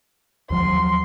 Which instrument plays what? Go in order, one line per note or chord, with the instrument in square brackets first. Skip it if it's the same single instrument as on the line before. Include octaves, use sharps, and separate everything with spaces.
[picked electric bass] D#2 F3 F#3 [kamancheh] C6